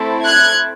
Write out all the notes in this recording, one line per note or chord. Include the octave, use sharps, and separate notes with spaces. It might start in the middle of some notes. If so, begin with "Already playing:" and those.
Already playing: A3 C4 E4 A4
F#6 G#6